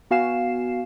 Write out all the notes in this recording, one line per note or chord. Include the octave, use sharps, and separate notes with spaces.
B3 F#4 F5 G#5 C7 E7